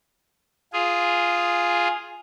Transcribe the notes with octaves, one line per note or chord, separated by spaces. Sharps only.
F4 G#4